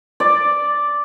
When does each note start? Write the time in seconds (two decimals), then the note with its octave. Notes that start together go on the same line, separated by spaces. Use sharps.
0.20 D5